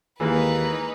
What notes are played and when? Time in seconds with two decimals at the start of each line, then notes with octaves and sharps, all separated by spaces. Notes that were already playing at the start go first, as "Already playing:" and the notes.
0.20 D#2 E3 G#3 A#3 D#4 B4